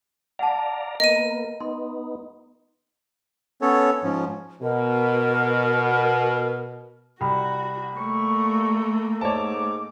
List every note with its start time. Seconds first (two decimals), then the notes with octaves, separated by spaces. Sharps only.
0.39 D5 F5 F#5 A5 A#5
1.00 A#3 B3 A#4 D#5 D#7
1.61 B3 D#4 C6
3.62 B3 C#4 A4 C#5
4.03 G#2 F3 C#4
4.62 B2 A#4
7.21 C2 F#4 G5 B5
7.97 A3 A#3 C#6
9.21 G#2 C#5 A5 D6